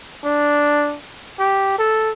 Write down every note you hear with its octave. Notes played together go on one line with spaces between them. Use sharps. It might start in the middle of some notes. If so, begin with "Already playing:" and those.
D4
G4
A4